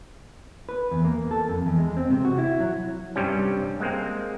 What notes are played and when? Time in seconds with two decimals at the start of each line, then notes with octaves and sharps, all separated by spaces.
0.69 B4
0.91 E2
1.05 A#3
1.31 A4
1.48 F2
1.66 E2
1.78 G#3
1.97 C4
2.10 C3
2.25 F#4
2.38 E4
2.60 F#3
3.16 G2 C3 G3 C#4
3.80 G#3 A#3 C4